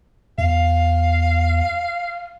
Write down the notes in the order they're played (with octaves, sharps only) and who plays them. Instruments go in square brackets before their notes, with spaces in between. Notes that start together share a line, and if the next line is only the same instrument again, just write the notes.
[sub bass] E2 [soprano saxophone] F5